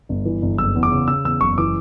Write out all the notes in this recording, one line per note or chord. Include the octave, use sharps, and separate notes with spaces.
G1
E3
G1
F#1 E6
E2
D6
C#3
C#3 E6
E2 E6
F#1 C#6
E3 D6